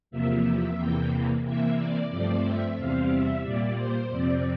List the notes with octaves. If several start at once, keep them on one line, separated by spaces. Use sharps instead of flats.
E2 C3 F3 A#3 E5
E2 C3 E3 A#3 G5
C3 E3 A#3 E5
D5
G2 F3 A3 C4 D5
E5
E2 C3 G3 C4 F5
E5
A#2 G3 A#3 D5
C5
F2 C3 F3 C4 D5